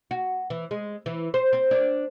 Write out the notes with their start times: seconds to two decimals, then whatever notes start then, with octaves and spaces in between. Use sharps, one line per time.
0.11 F#4
0.50 E3
0.71 G#3
1.06 E3
1.34 C5
1.53 C4
1.71 D4